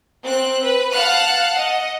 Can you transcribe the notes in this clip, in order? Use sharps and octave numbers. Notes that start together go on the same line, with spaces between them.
C4 F#6
B4
F5 F#5 A5 F6 F#6
D#5 F#5